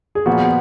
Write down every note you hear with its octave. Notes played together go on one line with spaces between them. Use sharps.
G#4
A#2 F3 B3 F#4